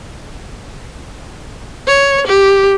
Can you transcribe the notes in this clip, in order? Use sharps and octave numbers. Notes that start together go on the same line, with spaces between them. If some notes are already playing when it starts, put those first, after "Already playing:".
C#5
G4